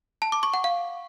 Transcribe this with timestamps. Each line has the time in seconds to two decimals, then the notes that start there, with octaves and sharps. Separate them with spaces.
0.22 A5
0.32 D6
0.43 C#6
0.54 F#5
0.64 F5